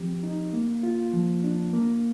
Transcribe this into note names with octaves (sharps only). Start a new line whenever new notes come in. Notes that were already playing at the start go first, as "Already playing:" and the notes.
Already playing: F3 C4 G4
D#4
A#3
F4
F3
D4
A#3